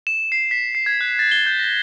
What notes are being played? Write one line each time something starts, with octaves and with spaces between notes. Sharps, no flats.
E7
C7
B6
C7
G#6
F#6
A6
G7
G6
A#6